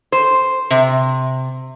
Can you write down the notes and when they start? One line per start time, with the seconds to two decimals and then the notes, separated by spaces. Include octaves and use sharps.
0.12 C5
0.70 C3